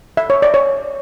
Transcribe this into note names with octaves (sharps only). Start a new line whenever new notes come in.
E5
C#5
D5
C#5